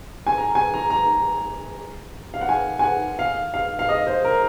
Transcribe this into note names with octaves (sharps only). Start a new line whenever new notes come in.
G#5
A#5
G#5
A#5
A#5
F5
F#5
G#5
G#5
F#5
F5
F5
F5
D#5
C5
A#4